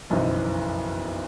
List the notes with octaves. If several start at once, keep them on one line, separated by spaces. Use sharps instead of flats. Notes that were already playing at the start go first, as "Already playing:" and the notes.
F#1 B1 F2 E3 C5 D#5